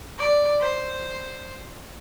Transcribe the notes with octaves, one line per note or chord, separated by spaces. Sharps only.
D5
C5